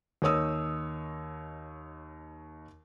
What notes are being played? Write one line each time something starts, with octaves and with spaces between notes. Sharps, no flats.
D#2 D#4 C#5 D#6 E6